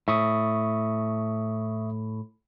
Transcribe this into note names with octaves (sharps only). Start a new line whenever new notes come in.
A2 E5 C#6 D#6